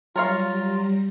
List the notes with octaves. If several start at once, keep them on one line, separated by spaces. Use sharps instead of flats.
F#3 G3 F4 A#4 C#5 F5 A#5